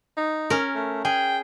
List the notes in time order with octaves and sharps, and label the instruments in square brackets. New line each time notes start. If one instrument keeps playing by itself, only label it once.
[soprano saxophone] D#4
[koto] C#4 A#4
[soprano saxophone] A3
[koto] G#4 [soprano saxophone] G5